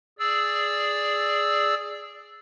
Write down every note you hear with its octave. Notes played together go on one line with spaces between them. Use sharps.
G#4 D5 E6